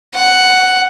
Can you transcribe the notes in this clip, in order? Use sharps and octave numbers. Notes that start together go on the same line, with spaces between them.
F#5